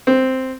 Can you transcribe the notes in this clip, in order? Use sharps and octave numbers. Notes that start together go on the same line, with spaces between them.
C4